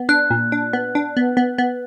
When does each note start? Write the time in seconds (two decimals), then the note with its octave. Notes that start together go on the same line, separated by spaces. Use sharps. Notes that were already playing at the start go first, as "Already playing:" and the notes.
Already playing: B3
0.09 D4 F#6
0.30 A#2
0.52 D4
0.73 B3
0.95 D4
1.17 B3
1.37 B3
1.58 B3